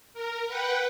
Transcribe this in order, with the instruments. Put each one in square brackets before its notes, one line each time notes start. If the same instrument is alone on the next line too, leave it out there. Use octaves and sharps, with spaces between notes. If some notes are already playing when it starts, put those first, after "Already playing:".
[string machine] A#4
B4 F#5 G5